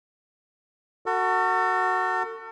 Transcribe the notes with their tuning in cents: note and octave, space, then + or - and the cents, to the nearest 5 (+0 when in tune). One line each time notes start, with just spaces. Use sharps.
F#4 +0 A4 +40